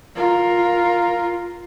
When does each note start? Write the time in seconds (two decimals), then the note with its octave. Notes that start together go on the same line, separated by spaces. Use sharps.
0.15 F4 A#4